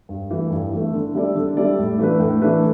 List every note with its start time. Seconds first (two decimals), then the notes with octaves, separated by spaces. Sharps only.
0.09 G2
0.31 E3 A3
0.51 G2
0.72 E3 A3
0.93 D3
1.14 G3 E4 A4 D5
1.35 D3
1.57 G3 E4 A4 D5
1.78 A2
1.99 E3 A3 D4 B4
2.20 A2
2.42 E3 A3 D4 B4